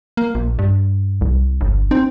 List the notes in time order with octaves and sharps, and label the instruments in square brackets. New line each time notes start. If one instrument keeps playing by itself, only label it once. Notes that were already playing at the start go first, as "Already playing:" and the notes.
[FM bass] A#3
A#1
G2
[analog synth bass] C2
[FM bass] G1
[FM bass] C4 [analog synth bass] D#4